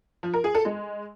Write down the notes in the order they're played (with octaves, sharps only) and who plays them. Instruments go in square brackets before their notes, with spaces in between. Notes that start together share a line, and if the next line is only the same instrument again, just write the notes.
[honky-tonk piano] F3
A#4
G#4
A4
G#3